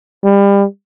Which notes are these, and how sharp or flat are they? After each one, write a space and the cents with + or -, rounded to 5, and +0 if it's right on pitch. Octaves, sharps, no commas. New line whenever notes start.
G3 +30